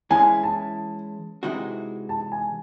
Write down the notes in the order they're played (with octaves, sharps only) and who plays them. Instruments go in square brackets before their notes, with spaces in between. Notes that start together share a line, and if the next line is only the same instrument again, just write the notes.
[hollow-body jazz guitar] E3 G#3 C#4 E4 [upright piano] G#5
[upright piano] A5
[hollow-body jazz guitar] C3 E3 G#3 D#4 F#4
[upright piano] A5
G#5